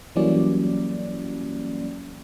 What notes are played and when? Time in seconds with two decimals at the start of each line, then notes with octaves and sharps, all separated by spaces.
0.16 E3 F#3 G3 A#3 C#4 D5